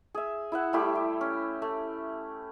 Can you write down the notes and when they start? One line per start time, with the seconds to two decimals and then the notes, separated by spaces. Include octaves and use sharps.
0.15 G#4 E5
0.52 E4 E5 F#5
0.73 G3 A3 E4 G4
0.95 G4
1.21 C#4
1.62 A3